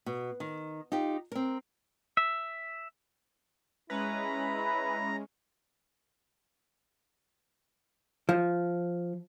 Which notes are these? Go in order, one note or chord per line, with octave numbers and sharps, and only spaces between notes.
B2
D#3
D#4 F4 G4
C4 A#4
E5
G#3 C#4 E4 B4 A#5
F3